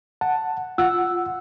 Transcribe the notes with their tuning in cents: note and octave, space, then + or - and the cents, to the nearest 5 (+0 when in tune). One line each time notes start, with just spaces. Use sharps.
F#5 +0 A5 +10
F4 +0 F#5 +0 E6 +0